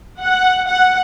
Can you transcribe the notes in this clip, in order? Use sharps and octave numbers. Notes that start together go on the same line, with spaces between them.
F#5
F#5